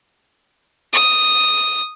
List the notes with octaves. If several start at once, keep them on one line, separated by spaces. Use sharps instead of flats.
D#6